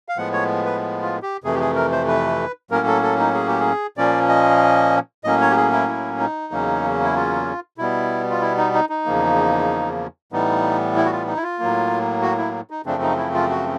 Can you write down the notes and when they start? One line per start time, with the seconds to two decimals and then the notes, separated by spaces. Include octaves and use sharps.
0.09 F5
0.17 A2 F3 G#3 B3 F#5
0.33 C#5
0.65 B4
1.02 F4
1.22 G4
1.44 F2 C3 E3 A3 G#4
1.55 G4
1.60 G#4
1.75 A#4
1.92 C5
2.07 B4
2.71 A2 F#3 A#3 C#4 A#4
2.86 A4
3.03 A4
3.18 D#4
3.35 G#4
3.48 G4
3.60 G#4
3.97 A#2 F3 A#3 C#4 D5
4.29 D#5
5.24 A2 F#3 A#3 C#4 D#5
5.41 C#5
5.50 G4
5.57 G#4
5.72 E4
5.88 E4
6.19 D#4
6.51 E2 C#3 F#3 A#3 C#4
7.03 E4
7.16 F4
7.78 B2 G3 B3 E4
8.30 F4
8.42 E4
8.57 D#4
8.74 D#4
8.89 D#4
9.05 E2 C#3 F3 A#3
10.32 A2 E3 G3 B3 D#4
10.96 E4
11.05 F#4
11.12 F4
11.27 D#4
11.37 E4
11.43 F4
11.59 A2 F#3 A#3
12.22 F#4
12.38 E4
12.70 D#4
12.86 F#2 C#3 F3 A3 C4 D4
13.02 D#4
13.17 E4
13.34 F4
13.50 F#4